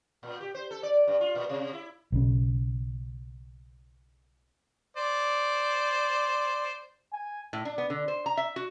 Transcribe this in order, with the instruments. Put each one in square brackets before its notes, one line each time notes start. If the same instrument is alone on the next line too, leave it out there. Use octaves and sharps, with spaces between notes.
[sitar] A#2
G4
C5
A4
D5
G2
F4
A#2
C3
E4
[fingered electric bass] B1 C#3
[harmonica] C5 D5
[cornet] G#5
[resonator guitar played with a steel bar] A2
D4
B3
D3
C5
A#5
E5
F#4